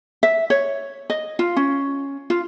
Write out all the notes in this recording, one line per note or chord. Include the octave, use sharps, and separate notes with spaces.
E5
C#5
D#5
F4
C#4
F4